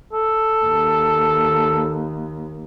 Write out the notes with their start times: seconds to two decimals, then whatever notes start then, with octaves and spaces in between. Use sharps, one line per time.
0.12 A4
0.65 D#2